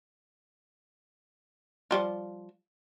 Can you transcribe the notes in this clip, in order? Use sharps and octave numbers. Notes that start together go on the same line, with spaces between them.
F3 G3 F4